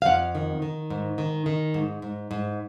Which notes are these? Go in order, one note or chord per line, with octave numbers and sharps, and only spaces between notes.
F5
F2 F#5
D#3
D#3
G#2
D#3
D#3
G#2
G#2
G#2